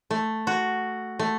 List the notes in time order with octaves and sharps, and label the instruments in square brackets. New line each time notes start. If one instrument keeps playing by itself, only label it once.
[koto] A3
F#4
A3